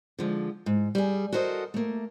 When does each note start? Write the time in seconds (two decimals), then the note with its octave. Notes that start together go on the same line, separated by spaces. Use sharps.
0.19 D3 F3 G#3
0.66 G#2
0.95 G3 G#4
1.33 F#4 A4 A#4 C5 C#5 D#5
1.74 A3 A#3